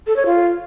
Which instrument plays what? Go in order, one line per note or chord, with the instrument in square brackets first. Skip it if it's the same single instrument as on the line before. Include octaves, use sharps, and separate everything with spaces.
[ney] A4
C#5
F4